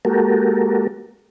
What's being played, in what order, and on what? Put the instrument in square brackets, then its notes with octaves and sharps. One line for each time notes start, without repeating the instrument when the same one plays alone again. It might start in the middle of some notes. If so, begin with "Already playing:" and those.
[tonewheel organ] G#3 A#3 F#4 G4 A4 A#4